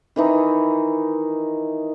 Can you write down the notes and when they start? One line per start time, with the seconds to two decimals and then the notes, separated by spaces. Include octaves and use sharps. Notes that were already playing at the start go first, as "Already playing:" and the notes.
0.16 D#3 E3 D#4